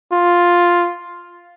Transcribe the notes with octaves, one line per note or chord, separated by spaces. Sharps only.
F4